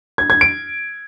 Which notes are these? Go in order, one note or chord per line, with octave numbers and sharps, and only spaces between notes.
G#6
G#6
D7